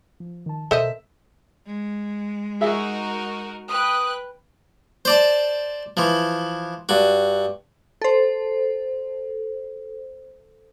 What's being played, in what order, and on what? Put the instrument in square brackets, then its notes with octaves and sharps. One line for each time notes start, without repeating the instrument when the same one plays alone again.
[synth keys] F3
D#3 A5
[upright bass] B2 [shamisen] A4 C5 D#5 [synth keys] A#4 [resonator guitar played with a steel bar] E5
[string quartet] G#3
[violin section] D#4 F#4 A#4 [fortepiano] G#4 E5
[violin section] B4 G5 F#6 [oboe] D#6
[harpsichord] C5 D5 A5
E3 F3
G2 F#4
[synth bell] A4 C5